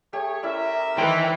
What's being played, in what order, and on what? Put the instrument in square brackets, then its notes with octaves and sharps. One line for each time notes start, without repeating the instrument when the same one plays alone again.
[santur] A3 G4 [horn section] G#4 C#5
[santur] C#4 E4 D5 [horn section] A#4 E5
[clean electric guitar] D#3 G5 [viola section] E3 [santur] G4 C5 B5